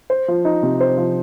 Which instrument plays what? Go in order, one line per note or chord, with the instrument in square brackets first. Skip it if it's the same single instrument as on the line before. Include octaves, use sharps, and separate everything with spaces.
[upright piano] C5
F3
D#4
C3
C5
F3